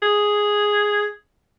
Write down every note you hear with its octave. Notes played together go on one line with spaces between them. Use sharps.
G#4